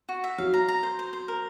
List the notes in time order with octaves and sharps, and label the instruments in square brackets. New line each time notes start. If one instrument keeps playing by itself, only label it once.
[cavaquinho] F#4
E5
[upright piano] F#3 [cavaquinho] F5
[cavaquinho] A#5
A#5
C5
C5
C5
A#4